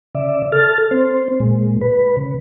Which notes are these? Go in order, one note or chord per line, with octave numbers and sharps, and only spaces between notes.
C#3 D5 E5
A4 F6 A6
C4 C5
A#2 G#3
B4
C#3